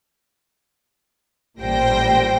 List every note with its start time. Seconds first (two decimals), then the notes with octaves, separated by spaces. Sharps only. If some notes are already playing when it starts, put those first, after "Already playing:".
1.60 A1 A#2 G3 C5 G5 A#6